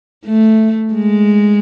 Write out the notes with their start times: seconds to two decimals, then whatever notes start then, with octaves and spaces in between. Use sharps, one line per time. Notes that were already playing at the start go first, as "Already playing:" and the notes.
0.25 A3
0.94 G#3